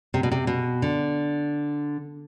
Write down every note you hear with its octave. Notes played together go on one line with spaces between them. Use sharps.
C3
B2
C3
B2
D3